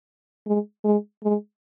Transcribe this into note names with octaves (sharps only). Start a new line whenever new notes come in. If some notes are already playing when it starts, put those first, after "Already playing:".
G#3
G#3
G#3